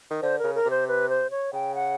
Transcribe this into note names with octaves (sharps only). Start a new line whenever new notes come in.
D#3
D3 C5
A#4
C#3
A#4
C3
C5
B4
C5
C#5
C#3 G5
F#5